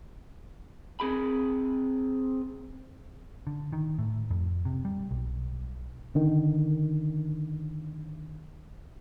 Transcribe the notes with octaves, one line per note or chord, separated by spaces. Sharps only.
C4 G#4 B5
D3
D#3
A2
F2
C3
G3
B1
D3 D#3